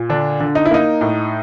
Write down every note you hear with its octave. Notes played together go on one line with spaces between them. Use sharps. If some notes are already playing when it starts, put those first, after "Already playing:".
Already playing: A#2
D3 D4
D3
D#4
E4
A#3 D#4
A2